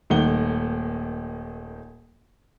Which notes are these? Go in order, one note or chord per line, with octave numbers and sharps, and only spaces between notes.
D#1 D#3 A3 F#5 G7